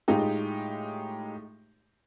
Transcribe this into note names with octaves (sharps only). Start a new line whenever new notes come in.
A2 G#3 D#4 F4 G4